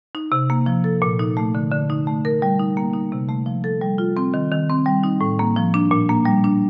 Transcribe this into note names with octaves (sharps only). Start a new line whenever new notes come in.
D#4
C3
A#3
F3
A4
A#2
D#4
A3
D3
D3
D#4
A3
A#4
G3
D#4
A#3
D#4
C3
A3
F3
A4
G3
F4
C4
D#3
D#3
C4
G3
D#4
A2
A#3
F3
D4
A#2
A#3
G3
D4